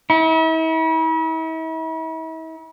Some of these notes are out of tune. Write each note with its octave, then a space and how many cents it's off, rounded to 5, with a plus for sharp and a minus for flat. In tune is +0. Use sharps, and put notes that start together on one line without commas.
E4 -40